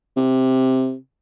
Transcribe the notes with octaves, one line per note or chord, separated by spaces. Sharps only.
C3